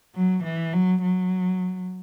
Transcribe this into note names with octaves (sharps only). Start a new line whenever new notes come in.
F#3
E3
F#3
F#3